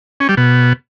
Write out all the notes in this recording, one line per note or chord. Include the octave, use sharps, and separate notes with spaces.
C#4
G3
B2